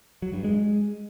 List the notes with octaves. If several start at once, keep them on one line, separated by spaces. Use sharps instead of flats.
F#3
G2
G#3